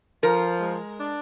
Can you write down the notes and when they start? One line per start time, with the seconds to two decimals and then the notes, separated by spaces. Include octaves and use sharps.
0.23 F3 A#4
0.61 G#3
0.99 D4